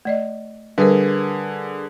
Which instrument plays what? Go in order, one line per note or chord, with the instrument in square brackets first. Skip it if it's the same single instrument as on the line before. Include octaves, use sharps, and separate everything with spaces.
[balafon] A3 D5 D#5
[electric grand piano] D3 G#4 [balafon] G3 [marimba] A#4 B4